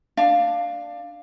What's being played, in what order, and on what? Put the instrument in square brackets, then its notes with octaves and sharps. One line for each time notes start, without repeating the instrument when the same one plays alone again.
[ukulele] D4 F5